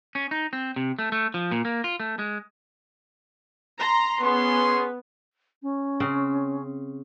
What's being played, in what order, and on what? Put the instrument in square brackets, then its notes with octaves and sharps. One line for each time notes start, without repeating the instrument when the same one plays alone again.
[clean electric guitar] C#4
D#4
C4
C3
A3
A3
F3
A#2
A#3
F4
A3
G#3
[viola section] A#5 C6
[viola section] B3 [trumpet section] C#4 G#4 C6
[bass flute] C#4
[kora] C#3 C4